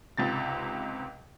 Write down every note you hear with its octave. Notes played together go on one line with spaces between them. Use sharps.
C#2 G#2 C3 A6